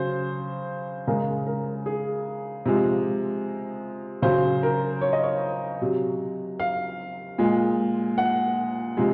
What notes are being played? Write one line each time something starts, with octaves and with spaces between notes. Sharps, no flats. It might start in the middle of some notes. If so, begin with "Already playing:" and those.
Already playing: C#3 F#3 C5
C#3 G#3 A#4
A#4
G#4
C3 F3 G#3
C#3 F#3 C5
A#4
C#5
D#5
C#5
C3 F#3
F5
A#2 G#3
F#5
C3 F3 G#3